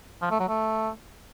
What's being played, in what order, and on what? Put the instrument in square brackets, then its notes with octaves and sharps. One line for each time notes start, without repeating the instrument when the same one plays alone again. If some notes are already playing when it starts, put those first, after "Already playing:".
[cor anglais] F3
A3
F#3
A3